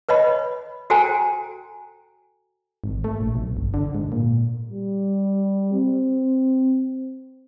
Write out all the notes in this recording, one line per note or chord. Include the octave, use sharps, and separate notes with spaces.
B4 C#5 D#5 B5
F#4 A4 C5 G5 G#5 A#5
G#1
A3
A#1
B1
G1
D3
G#2
A#2
G3
C4